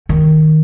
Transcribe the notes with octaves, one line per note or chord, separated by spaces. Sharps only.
D#3